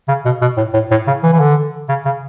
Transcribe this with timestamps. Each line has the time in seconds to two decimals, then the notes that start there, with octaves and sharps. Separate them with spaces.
0.08 C#3
0.25 B2
0.42 B2
0.57 A2
0.74 A2
0.91 A2
1.07 C#3
1.23 E3
1.33 E3
1.40 D3
1.89 C#3
2.05 C#3